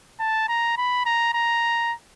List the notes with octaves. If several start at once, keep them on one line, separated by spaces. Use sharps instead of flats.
A5
A#5
B5
A#5
A#5